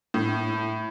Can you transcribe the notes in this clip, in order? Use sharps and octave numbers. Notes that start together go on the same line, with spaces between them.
A2